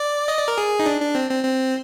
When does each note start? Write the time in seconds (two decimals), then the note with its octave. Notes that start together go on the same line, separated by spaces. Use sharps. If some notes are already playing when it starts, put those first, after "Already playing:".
Already playing: D5
0.28 D#5
0.38 D5
0.48 A#4
0.58 G#4
0.79 D#4
0.86 D4
1.01 D4
1.15 C4
1.29 C4
1.44 C4